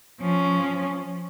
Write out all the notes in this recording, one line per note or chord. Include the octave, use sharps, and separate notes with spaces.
F3 C#4